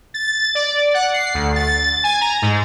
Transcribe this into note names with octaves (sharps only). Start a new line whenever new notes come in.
A6
D5
F#5
C7
D2
A6
G#5
A#5
G#2